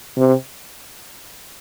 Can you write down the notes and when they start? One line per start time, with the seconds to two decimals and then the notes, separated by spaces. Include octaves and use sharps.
0.17 C3